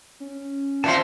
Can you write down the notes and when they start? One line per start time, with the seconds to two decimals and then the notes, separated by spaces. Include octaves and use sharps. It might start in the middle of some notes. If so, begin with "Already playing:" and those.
0.20 C#4
0.84 A#2 E3 C4 E4 F4 A5 C6